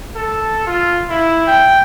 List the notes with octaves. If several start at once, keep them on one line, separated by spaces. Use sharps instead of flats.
A4
F4
E4
G5